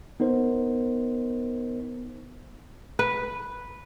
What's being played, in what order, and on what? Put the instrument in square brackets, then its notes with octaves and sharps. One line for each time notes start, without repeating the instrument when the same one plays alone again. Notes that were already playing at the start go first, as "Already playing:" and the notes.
[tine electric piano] B3 D#4 A#4 C5
[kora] B4